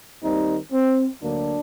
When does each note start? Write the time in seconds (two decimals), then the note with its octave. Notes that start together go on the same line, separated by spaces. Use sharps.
0.23 D#2 D#3 G3 C4 D#4
0.72 C4
1.21 D2 D3 F#3 A#3 D4